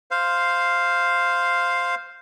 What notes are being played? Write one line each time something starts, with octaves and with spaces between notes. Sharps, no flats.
C5 F5